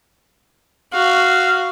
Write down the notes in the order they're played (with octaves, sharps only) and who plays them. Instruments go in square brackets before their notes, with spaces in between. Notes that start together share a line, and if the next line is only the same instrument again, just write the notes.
[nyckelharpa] F#4 [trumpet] F5